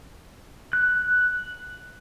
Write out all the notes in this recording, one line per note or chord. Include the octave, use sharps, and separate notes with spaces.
F#6